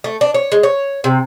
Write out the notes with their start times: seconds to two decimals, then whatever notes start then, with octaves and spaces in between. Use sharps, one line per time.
0.04 A3
0.21 D4
0.34 C#5
0.52 G#3
0.63 C#5
1.04 C3